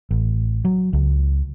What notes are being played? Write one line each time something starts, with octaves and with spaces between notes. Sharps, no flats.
A1
F#3
C#2